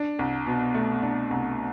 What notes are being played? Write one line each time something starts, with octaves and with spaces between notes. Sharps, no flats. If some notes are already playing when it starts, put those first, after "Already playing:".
Already playing: D4
C2
B2
A3
D4
C2